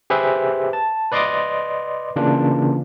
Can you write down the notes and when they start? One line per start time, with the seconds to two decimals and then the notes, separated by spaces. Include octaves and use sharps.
0.10 G4 G#4 B4 C5 E5
0.73 A5
1.12 B4 D5 D#5 C6 D6 D#6
2.16 C#3 E3 A#3 D4 F4